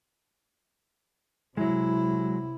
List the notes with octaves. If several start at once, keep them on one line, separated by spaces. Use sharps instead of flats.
C3 F#3 G#3 E4